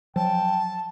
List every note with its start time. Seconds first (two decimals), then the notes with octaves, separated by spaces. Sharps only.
0.16 F3 F#3 G5 A5